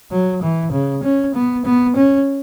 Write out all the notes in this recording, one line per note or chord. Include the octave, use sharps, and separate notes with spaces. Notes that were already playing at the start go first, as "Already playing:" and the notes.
F#3
E3
C#3
C#4
B3
B3
C#4